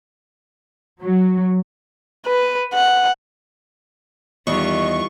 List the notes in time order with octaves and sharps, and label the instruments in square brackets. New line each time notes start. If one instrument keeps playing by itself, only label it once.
[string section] F#3
[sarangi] B4
F#5
[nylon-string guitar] E2 [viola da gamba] D#3 G3 F4 [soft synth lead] D#5 [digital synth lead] C#6